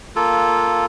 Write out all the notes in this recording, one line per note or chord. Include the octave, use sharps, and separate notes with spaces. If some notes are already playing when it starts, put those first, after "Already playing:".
A#3 F4 A4